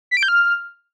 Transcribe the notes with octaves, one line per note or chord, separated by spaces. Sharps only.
B6
D7
G6
F6